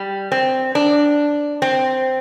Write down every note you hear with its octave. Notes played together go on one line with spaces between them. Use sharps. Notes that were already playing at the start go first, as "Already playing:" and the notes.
Already playing: G3
C4
D4
C4